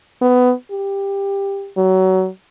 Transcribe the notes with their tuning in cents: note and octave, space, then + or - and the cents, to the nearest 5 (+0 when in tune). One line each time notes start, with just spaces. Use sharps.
B3 +15
G4 +15
F#3 +25